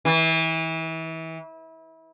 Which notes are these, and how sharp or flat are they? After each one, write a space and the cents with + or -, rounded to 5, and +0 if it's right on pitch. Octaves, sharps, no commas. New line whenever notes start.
E3 -30